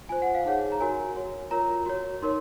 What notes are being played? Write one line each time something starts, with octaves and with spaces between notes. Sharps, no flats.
F4 C5 G#5
F#5
F5
D#4 G#4 C#5 F#5
A#5
F#4 A#4 C#5 G#5
F#4 C#5
F4 A#4 C#5 A#5
F#4 C#5
D#4 A#4 C#5 C6